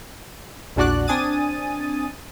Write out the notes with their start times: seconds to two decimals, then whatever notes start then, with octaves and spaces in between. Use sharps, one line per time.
0.76 A#1 E2 D4 F#4 D5 F#6
1.08 C4 D4 G#5 D#6 A6 D#7